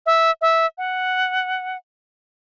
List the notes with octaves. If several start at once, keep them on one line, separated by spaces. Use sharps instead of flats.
E5
E5
F#5